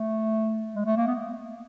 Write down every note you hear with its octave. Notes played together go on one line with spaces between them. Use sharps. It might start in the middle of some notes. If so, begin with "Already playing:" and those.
Already playing: A3
G#3
A3
A#3
B3